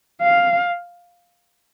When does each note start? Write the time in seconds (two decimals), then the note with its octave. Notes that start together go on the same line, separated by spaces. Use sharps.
0.22 F5